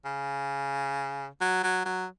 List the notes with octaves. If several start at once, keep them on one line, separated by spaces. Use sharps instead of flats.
C#3
F#3
F#3
F#3